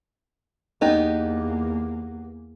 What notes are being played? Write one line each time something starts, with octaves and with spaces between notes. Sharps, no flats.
E2 A#3 B3 D#4 G4